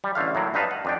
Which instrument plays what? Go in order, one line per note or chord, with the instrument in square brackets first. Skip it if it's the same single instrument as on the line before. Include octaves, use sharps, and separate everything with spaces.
[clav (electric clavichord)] G3
A1 D3 A3 F5
A2 F#3 A#3
G2 D#4 B4 F5 A5
F#5
F2 D4 G5